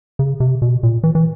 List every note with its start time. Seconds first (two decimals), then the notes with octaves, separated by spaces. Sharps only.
0.19 C#3
0.40 C3
0.62 B2
0.83 A#2
1.04 E3
1.15 E3